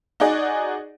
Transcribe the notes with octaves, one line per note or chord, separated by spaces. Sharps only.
D#4 F#4 G#4 D5 D#5